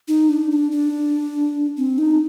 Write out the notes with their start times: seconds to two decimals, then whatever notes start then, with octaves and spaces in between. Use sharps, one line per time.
0.08 D#4
0.29 D4
0.51 D4
0.72 D4
1.78 C4
1.98 D#4